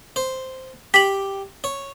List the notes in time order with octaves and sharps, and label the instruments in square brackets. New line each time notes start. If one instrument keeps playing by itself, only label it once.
[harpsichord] C5
[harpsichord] G4 [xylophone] B6 F#7
[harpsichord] C#5